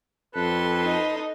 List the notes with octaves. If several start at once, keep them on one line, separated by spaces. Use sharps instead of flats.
F2 A4 B4 C6
D#4